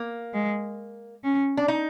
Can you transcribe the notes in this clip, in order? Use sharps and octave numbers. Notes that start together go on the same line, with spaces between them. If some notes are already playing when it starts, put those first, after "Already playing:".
Already playing: A#3
G#3
C#4
D4
D#4